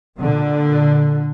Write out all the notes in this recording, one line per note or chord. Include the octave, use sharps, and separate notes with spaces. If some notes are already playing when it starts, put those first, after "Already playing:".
A#2 D3